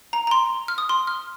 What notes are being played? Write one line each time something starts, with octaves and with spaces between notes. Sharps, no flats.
A#5
A#5
C6
F6
D#6
C6
F6